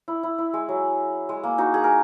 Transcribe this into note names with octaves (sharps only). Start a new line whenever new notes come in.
E4
E4
E4
G#3
F#3
G#3
A#3
D#4 F#4
G#4
A#4